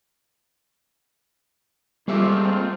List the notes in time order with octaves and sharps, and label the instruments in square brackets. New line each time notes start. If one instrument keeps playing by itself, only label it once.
[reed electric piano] G3 E5 D6 [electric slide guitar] A#3 G#4 A4 [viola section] C4 F4